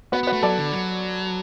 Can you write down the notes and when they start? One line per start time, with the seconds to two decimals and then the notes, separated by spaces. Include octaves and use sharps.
0.12 B3 F#4 B4
0.23 B3 F#4 B4
0.33 A3
0.43 F#3 A4 D5
0.58 D3
0.72 F#3